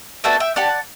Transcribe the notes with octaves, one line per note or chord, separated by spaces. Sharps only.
B3 D4 F#4 A4 E5 G5
E5 G5
D4 G4 D5 F#5